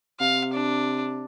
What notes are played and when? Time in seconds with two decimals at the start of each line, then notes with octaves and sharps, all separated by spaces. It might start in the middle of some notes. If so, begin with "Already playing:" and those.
0.20 C3 F5
0.54 D4